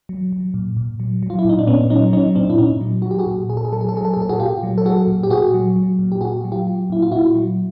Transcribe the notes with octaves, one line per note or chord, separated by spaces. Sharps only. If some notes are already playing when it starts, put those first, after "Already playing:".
F#3
F#3
A#2
A#2
F#3
F#3
F4
E4
A#2 D#4
D4
A#2 B3 C#4
F#3 C#4 D#4
F#3 C#4 D#4
A#2 C4 D4
E4
A#2 C#4 D#4
F#3
F#3 F#4
G4
F#4 G#4
A#2
A#2 G#4
A4
G#4
F#3 A4
G#4
A4
F#3 G#4
A4
G#4
A#2
A4
F#4 G#4
A#2 F4 G4
F#3
A4
F#3 F#4 G#4
A#2
G4
A#2 F#4 G#4
F#3
F#3
A#2
G4
A#2 F#4 G#4
F#3
F4 G4
F#3
A#2 E4
F4
A#2 E4 F#4
F#3